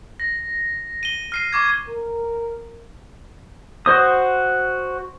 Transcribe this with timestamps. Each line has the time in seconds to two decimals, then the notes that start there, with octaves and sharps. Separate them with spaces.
0.20 A#6
1.03 D#7 G7
1.32 F6 C7 D#7
1.53 C#6 D6 G#6
1.88 A#4
3.86 F#4 C5 D#6